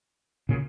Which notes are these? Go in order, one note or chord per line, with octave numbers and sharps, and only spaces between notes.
A#2 C#3